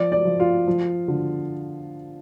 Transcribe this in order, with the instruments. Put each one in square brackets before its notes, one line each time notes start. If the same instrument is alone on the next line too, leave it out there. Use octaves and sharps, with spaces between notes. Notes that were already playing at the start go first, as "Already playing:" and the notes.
Already playing: [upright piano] F3 D5
D5
F3
F4
F3
D3